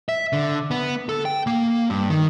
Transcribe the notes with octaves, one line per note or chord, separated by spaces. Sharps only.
E5
D3
B3
A4
G5
A#3
G2
D#3